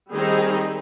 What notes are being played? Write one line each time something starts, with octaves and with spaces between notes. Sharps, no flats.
D#3 G3 C4 D#4 G#4